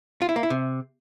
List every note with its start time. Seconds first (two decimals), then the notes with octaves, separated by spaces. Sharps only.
0.22 F4
0.29 E4
0.36 A#3
0.43 E4
0.50 C3